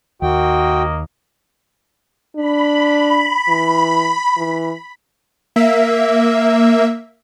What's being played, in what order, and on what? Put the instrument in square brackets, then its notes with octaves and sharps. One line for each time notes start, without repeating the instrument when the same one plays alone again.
[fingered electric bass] D#2 [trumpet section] A#3 D#5 [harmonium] F#4 G5
[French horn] D4 [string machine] B5
[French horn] E3
E3
[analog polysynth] A#3 E5